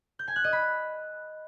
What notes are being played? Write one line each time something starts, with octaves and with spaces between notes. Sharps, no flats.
G6
G#5
F#6
D#5
B5